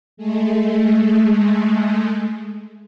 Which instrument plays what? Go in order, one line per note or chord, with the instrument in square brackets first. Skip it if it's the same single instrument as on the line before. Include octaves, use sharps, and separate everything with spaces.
[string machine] G#3 A3